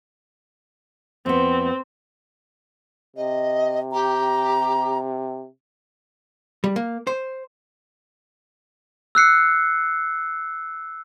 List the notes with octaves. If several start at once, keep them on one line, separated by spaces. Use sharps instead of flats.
F2 B3 C4
C3 D#5
G4 A#5
G3
A#3
C5
E6 F#6 C7 C#7